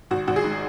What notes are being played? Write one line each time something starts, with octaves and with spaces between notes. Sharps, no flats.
G#1 F#4
G#1 F#4
G#4
G#2